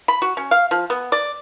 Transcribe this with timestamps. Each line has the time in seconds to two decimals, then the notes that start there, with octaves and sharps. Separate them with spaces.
0.08 B5
0.22 F#4
0.37 C#4
0.51 F5
0.71 F3
0.90 B3
1.12 D5